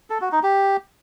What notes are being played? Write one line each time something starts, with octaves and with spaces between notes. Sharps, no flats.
A4
F#4
D#4
G4